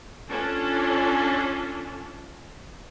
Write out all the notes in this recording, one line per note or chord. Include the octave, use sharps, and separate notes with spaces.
C#4 D4 F4 A4